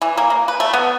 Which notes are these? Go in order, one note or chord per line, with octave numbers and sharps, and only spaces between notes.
E3
A#3
A#3
B4
A3
B3